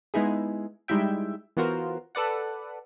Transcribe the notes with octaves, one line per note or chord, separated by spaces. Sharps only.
G#3 B3 D#4 E4 G#4
G3 G#3 D#4 E4 E5 G5
E3 B3 F4 F#4 A#4 C5
A4 B4 D5 F#5